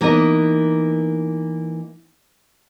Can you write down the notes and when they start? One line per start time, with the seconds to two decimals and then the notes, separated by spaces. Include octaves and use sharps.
0.01 E3 A#3 B3 D#4 D#5